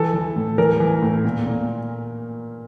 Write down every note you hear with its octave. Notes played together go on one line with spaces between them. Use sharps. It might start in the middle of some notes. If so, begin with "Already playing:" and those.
Already playing: E3 A4
E3
A2
E3 A#4
E3
A2
A#2
A#2